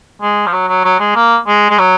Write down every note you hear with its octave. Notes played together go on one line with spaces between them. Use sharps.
G#3
F3
F#3
F#3
F#3
G#3
A#3
G#3
G#3
F#3